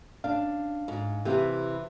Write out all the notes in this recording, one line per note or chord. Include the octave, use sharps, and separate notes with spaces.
C#4 D4 F5
G#2
C3 E3 G4 B4